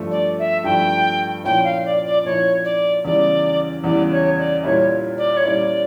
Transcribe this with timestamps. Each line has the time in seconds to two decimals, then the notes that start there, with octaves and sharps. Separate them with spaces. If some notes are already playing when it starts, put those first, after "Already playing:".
Already playing: G2 F3 A3
0.11 D5
0.38 E5
0.64 G2 F3 A3 G5
1.44 A#2 F3 C#4 E4 G5
1.64 F5
1.85 D5
2.04 D5
2.25 A#2 F3 C#4 E4 C#5
2.64 D5
3.04 E2 C#3 E3 G3 D5
3.84 E2 C#3 E3 G3 D5
4.11 C#5
4.38 D5
4.64 A#2 G3 C#4 E4 C#5
5.17 D5
5.36 C#5
5.44 A#2 G3 C#4 E4 D5